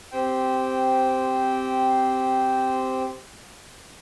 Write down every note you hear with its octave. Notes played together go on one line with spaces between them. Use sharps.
C4 G4 C5 G5